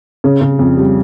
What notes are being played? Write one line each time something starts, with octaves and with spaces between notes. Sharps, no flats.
C#3
C#3
F2
G3